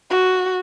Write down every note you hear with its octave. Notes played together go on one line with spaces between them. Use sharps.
F#4